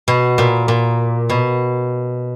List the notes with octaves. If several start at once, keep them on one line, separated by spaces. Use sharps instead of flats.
B2
A#2
A#2
B2